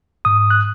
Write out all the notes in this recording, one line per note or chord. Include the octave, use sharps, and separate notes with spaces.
G#2 D#6
F#6